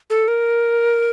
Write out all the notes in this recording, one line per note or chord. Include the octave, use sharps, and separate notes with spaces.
A4
A#4